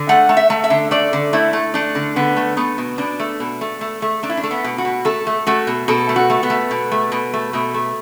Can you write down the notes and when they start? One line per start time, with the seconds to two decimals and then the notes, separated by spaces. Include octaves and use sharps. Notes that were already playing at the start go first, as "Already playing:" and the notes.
Already playing: D3
0.09 A3 F#5
0.29 A3
0.37 E5
0.50 A3
0.64 E5
0.70 D3
0.91 A3 D5
1.13 D3
1.33 A3 E4
1.53 A3
1.74 A3 D4
1.95 D3
2.16 D3 B3
2.36 A3
2.57 A3 B3
2.78 B2
2.98 B2 D4
3.20 A3
3.40 B2
3.61 A3
3.81 A3
4.02 A3
4.23 A3 D4
4.30 E4
4.37 D4
4.43 A3
4.51 B3
4.64 B2
4.78 F#4
4.85 B2
5.05 A3 A4
5.27 A3
5.47 A3 F#4
5.67 B2
5.88 B2 A4
6.09 A3
6.16 F#4
6.30 A3
6.43 B3
6.50 A3
6.71 B2
6.92 A3
7.12 B2
7.33 A3
7.53 B2 A3
7.74 A3